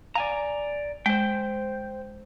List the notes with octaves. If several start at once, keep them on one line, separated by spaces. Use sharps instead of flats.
D5 F5 G#5 A#5
G#3 C5 G5